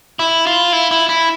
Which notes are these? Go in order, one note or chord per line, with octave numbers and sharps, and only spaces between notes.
E4
F4
E4
E4
E4